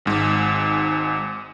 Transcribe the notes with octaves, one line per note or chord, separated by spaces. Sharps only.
G#1 G#2